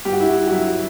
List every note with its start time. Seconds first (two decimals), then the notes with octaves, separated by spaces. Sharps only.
0.05 G2 G4
0.13 F#4
0.20 E4
0.28 F#4
0.48 F#4
0.52 F#3 E4